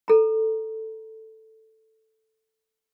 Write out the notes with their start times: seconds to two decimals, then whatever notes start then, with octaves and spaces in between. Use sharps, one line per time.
0.08 A4 A#5